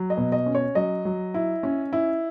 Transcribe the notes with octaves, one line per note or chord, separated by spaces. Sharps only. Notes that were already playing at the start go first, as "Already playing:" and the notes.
Already playing: F#3
D#5
B2
D#5
C#4
C#5
F#3 D#5
F#3
E4
C#4
E4